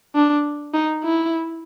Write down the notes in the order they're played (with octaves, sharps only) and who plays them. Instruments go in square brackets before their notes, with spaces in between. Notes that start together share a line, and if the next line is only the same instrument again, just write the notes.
[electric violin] D4
D#4
E4